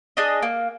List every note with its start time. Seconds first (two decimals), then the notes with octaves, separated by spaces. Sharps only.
0.17 D4 G#4 D#5
0.42 A#3